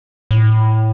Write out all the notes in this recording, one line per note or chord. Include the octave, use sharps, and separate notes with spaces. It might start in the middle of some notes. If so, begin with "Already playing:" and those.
A2